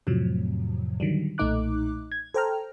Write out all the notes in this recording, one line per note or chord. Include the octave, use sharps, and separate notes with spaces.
F2 A2 C3 F3 F#3
D3 D#3 F#3 G3
B1 A#2 A3 D#4 D6 F#6
G#6
A4 C5 G5 A#5 F6